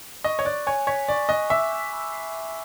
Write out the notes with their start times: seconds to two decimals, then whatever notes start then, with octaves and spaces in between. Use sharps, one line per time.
0.24 D#5 C#6
0.39 C#5
0.45 D5 F#6
0.67 C#5 G#5
0.87 C#5 B6
1.08 D5 C#6
1.29 D#5 F#6
1.50 E5 D6
1.72 G6
1.92 B5
2.13 C7
2.34 D6